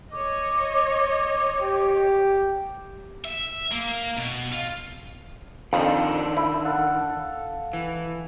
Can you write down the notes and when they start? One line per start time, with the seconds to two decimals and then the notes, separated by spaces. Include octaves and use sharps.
0.12 C#5 D#5 D6
1.62 G4
3.25 E5
3.71 A#3
4.17 B2
4.52 F4
5.73 F2 D#3 D4
6.37 E4
6.65 A4 F5 F#5
7.73 E3